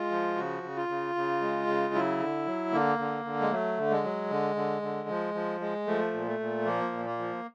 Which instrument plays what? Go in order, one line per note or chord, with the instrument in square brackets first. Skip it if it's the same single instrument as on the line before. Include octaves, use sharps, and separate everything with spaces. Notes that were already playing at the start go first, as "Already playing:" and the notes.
Already playing: [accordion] G#3 F4
F3
C#3 F#4
C#3
F4
C#3
C#3
G#3
C#3
F#3 E4
D3
F#3
D3 A#3
D3
D3
G#3
F#3 A3
D3
G#3
F#3
D3
D3
D3
F3
F3
G#3
F3 A3
A#2
A3
A#2
F3 A#3
A#2
A#3
F3